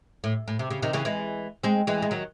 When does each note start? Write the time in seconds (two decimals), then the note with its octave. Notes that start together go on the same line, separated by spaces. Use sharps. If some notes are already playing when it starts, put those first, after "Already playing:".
0.24 A2
0.48 A2
0.59 C3
0.71 C#3
0.82 C3 D#3
0.93 C#3 E3
1.05 E3 G#3
1.64 G#3 C4
1.87 E3 G#3
2.02 G#3
2.11 D#3 F#3